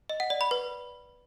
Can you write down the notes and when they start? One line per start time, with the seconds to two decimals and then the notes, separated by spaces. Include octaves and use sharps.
0.09 D#5
0.20 F#5
0.30 D5
0.41 B5
0.51 B4